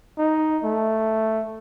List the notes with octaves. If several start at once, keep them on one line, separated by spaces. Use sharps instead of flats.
D#4
A3